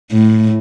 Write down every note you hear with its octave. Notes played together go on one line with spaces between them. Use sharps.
A2